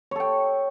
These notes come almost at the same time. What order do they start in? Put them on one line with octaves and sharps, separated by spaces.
C#5 A4 G5